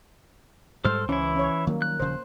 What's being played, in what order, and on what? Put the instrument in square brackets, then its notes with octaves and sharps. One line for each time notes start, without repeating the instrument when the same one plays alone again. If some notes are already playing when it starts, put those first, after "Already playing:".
[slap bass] G#2 G3 G#3 [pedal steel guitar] A4 F6 [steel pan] C5
[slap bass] C#2 [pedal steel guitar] E3 E4 [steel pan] C#4
[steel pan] C#4 C#5
[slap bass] D#3 F#3 G3 [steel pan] A#3
[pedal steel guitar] F#6
[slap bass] D#1 C#3 F3 [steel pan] C5